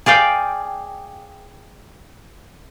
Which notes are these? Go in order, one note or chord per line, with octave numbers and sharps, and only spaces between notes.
G#4 D5 F5 G5